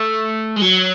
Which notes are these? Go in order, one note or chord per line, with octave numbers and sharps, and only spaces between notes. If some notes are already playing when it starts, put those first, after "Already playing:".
Already playing: A3
G#3
F#3